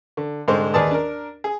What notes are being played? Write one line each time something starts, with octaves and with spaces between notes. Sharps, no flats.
D3
C2 G#2 D3 G#3 C5
D#2 G#4 B4 D5 A5 D#6
D4 A#4
G#4